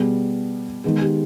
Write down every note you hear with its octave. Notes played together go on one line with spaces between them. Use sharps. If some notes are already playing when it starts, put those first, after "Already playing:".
Already playing: B2 G3 B3 G#4
D#3 G#3 B3 G#4
G4